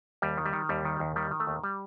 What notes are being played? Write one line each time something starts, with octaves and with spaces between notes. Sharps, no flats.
D#2 G3
D#3
G3
D#3
D#2 G3
D#3
D#2
D#3 G3
D#3
A3
D#2
G3